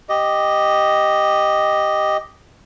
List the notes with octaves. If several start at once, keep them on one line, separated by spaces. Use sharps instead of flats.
G4 D#5